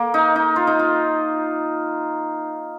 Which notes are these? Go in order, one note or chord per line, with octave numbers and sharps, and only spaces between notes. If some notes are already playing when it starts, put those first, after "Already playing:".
Already playing: A#3
D#4
D#4
F4
D#4
F4